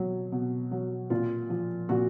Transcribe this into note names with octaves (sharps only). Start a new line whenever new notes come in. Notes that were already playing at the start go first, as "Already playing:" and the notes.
Already playing: B2 F#3
B2
F#3
A#2 F4
F3
A#2 F#4